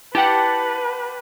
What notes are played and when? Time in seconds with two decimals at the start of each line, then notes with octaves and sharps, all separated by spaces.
0.15 E4 G4 B4 F#5 G5 A5